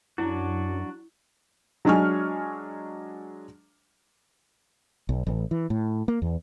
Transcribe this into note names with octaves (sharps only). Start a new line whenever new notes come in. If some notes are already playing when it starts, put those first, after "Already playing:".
F#2 F#3 D4 E4 F#4
F#3 G#3 D4 G#5 C#6 F6
B1
A1
E3
A2
A#3
E2